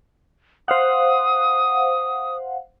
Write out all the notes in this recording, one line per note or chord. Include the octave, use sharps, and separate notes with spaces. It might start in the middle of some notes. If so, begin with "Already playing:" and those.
C5 F5 F#5 D#6